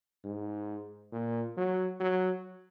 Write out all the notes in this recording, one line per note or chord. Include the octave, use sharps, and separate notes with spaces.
G#2
A#2
F#3
F#3